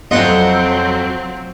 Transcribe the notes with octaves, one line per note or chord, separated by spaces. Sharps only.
F2 C#3 F#3 B3 C4 F4 D#5 F#5